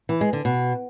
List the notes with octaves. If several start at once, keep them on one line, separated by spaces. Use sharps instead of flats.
E3
G#3
D3
B2